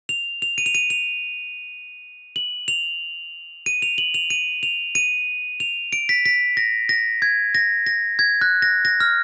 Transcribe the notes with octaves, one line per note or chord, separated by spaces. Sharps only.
F7
F7
D#7
F7
D#7
F7
F#7
F7
D#7
F7
F#7
F7
D#7
F7
D#7
F7
D7
B6
B6
A#6
A#6
G#6
A#6
A#6
G#6
F#6
A#6
A#6
F6